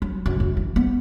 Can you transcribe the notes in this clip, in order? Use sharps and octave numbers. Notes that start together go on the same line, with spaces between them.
F#3
F#2
F#2
E3
B3